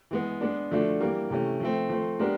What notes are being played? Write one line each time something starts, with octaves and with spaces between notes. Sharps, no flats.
E3 G#3 B3
G#3 B3 D4
D3 F3 A3 D4 F#4
E3 G3 A#3
C3 E3 A3 C#4
F3 A3 C4
F3 A3 C4
G#3 B3 D4 G4 A#4